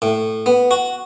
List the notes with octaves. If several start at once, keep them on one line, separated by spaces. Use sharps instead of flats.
A2
B3
F#4